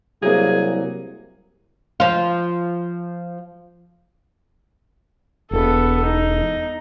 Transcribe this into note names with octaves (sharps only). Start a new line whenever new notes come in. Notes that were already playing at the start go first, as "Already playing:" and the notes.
C2 F#3 A#3 G#4
F3 F4
E1 B3 A4
D#4